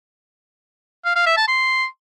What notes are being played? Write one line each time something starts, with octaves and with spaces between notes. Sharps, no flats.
F5
F5
E5
A5
C6